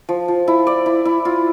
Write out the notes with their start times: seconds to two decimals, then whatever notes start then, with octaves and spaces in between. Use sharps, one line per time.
0.09 F3
0.28 F3
0.48 E4
0.67 D5
0.86 E4
1.05 E4
1.25 F4